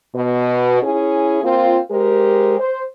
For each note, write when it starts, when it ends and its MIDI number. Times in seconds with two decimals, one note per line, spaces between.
0.15 0.81 47
0.83 1.43 61
0.83 1.43 64
0.83 1.43 68
1.43 1.79 58
1.43 1.79 60
1.43 1.79 65
1.91 2.56 56
1.91 2.56 67
1.91 2.56 70
1.91 2.56 72
2.59 2.84 72